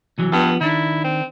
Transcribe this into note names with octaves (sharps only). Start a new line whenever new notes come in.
C2 E3 F#3
G2 F3 B3
D#3 D4 E4
C4